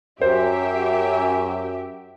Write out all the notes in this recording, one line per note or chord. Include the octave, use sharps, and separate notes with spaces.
F#2 G4 C5 E5